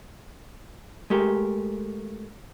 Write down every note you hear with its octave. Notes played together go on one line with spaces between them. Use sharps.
G#3 A3 G4 A#4